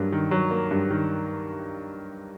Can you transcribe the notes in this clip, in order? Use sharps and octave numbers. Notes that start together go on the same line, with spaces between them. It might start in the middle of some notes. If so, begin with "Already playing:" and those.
Already playing: G2 F#3 A#3
D#3
F#3
A#3
G2
D#3